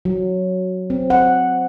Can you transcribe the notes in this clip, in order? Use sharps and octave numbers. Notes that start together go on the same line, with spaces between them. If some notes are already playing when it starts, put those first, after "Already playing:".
F#3
C4
F#5